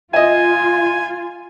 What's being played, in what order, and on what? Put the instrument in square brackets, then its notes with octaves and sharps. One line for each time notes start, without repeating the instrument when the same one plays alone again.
[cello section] F4 [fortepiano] D#5 E5 [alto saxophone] G#5